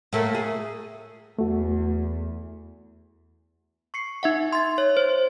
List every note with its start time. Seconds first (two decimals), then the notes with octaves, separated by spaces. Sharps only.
0.13 A2 A3 A#3
0.35 G#4
1.39 E2 A3 F#4
3.94 C#6 C7 C#7
4.23 D#4 E5 F#5
4.53 C6 A6
4.78 C#5
4.97 C5